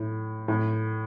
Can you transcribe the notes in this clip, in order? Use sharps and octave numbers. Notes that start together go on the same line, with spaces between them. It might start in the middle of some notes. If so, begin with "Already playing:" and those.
Already playing: A2
A2